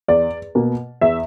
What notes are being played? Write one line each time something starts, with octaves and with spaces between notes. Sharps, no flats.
E2 D5
B2 A#3
E2 E5